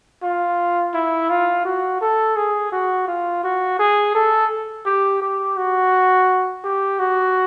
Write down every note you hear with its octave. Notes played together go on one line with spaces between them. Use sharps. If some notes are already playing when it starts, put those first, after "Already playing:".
F4
E4
F4
F#4
A4
G#4
F#4
F4
F#4
G#4
A4
G4
G4
F#4
G4
F#4